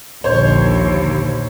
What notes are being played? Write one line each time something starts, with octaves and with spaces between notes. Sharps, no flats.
A#1 D#2 D3 C5 C#5